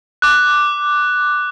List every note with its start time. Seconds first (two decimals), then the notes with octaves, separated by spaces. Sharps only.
0.22 D6 F#6